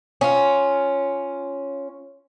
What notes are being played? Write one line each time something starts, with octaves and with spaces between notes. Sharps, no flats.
C#4 F4